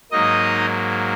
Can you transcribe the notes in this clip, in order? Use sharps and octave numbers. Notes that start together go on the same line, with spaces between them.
G#2 F#3 A#3 D#4 D#5